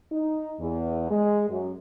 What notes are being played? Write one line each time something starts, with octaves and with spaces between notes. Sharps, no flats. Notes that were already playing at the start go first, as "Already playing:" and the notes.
D#4
E2
G#3
F#2